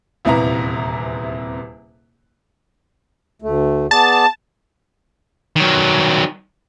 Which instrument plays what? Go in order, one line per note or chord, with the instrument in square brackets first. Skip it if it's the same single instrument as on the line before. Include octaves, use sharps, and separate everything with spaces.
[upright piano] D#1 E2 C3 E4 B4 A#5
[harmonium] D2 A3
[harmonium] B3 G#4 D5 [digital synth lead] A5
[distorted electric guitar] D#3 F#3